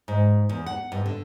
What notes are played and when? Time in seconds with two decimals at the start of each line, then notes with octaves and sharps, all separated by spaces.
0.08 G#2
0.49 E2
0.66 F#5
0.92 G2
1.06 D3